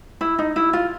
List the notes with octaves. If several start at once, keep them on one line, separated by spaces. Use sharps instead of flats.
E4
D#4
E4
F4